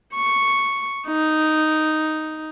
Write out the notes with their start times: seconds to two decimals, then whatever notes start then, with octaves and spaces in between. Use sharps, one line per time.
0.15 C#6
1.07 D#4